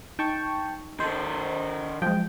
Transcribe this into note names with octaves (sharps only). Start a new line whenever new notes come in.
D#4 G5 A5 C#6
D#3 A4 C5
F3 F#3 G#3 G5